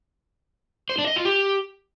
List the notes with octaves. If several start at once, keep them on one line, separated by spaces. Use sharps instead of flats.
C5
D4
D#5
F4
G4